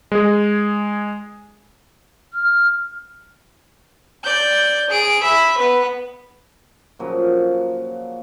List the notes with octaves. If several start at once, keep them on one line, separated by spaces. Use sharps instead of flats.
G#3 G#4
F6
D5 G6
G#4 D7
E5 B5
B3 B4
A#2 C#3 F3 F#3